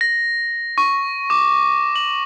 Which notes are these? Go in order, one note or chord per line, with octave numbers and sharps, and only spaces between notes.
A#6
C#6
D6
F#7